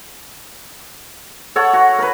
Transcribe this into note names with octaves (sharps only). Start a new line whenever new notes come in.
A4 C#5 F#5
F#4
A#4 B4